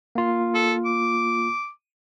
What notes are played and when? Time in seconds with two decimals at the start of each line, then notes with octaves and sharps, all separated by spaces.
0.15 A#3 F4
0.55 A4
0.85 D6